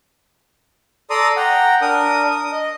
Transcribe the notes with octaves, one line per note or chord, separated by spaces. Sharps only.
A4 D5 A#5 C6 D#6
F#5 G5 A#5
D4 A#4 D#6
D#6
D#5